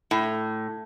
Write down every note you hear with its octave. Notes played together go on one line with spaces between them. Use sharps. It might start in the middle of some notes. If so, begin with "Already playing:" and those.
A2